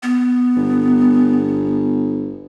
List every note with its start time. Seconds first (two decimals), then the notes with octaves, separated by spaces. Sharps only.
0.03 B3
0.56 G1